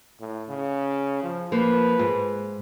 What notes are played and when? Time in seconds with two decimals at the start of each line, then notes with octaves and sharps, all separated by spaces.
0.20 A2
0.49 C#3
1.23 F3
1.52 F3 A#3 B4
1.99 G#2